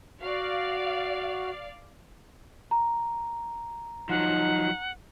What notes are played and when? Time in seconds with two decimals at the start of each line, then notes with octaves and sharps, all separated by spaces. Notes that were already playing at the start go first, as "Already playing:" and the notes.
0.22 F#4 D5 F5
2.71 A#5
4.09 F3 F#3 D#4 F#5